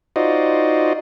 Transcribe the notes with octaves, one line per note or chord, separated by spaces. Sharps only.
D#4 F4 F#4 C5 D5 D#5